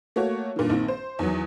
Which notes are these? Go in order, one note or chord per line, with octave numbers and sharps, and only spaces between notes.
A3 A#3 F#4 C#5
G2 A#2 D3 D#3
A#1 D#3 C4
C5
E2 D#3 E3 F#3